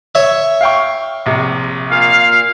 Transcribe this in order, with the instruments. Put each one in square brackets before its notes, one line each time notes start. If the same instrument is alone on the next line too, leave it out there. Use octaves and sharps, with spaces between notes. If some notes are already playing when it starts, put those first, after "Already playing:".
[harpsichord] C#5 E5
[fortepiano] F5 G5 C#6
A#1 C3
[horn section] A#2 F5